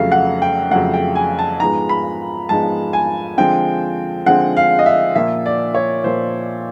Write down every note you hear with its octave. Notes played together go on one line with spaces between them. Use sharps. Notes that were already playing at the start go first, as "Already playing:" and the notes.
Already playing: F2 C#3 F#3 A3 F5
F#5
G5
F2 C#3 F#3 A3 F#5
G5
G#5
A5
G#2 F3 G#3 B3 D#4 A#5
B5
G#2 F3 G#3 B3 D#4 A5
G#5
D3 F3 G#3 C4 G5
D3 F3 G#3 C4 F#5
F5
D#5
E5
A#2 F3 A#3 E5
D5
C#5
A#2 F3 A#3 C5